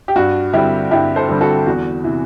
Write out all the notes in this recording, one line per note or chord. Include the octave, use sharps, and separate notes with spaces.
G4
G2 F#4
D3 G3 C4 E4 G4
G2 E4 G4
A4 C5
D3 G3 C4
F#4 A4
E2 F#4
C3 E3